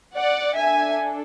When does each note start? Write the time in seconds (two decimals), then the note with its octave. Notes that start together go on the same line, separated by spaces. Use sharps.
0.15 D5 F#5
0.55 D4 A4 E5 G#5